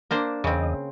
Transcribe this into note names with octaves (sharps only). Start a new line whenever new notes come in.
A#3 D4 C5
E2 C#3 C4 D#5